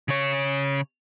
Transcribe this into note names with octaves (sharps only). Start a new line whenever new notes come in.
C#3 C#5